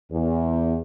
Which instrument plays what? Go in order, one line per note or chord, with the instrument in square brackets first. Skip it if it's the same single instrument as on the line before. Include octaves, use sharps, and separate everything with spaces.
[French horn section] E2